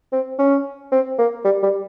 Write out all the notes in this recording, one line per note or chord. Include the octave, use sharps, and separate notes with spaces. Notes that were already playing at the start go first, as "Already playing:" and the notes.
C4
C#4
C4
A#3
G3
G3